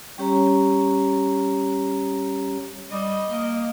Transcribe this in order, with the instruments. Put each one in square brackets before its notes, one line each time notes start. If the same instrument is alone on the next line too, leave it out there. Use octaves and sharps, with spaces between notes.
[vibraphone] G3 C#4 G4 C#5 A#5
[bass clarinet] G3 [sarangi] D#5
[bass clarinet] A#3